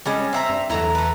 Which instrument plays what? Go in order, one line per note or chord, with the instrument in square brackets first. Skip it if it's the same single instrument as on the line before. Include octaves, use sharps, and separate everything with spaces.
[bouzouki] G3 G#3 C#4
C4 E5 A#5
[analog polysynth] G2
[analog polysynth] E2 A#5 [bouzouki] F#3 A3 E4
[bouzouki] A3 B4